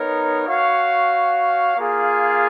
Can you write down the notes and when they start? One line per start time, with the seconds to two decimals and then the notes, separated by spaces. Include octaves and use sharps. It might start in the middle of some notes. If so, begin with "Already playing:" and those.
Already playing: B3 D#4 A#4 C#5
0.47 F#4 C#5 F5
1.77 A#3 F4 G#4